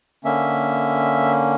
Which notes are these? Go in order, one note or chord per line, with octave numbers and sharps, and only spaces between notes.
D3 A#3 C#4 E5